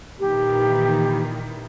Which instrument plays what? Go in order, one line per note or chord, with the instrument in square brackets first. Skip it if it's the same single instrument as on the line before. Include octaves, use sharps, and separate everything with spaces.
[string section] A#2 D#3 E3 [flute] G4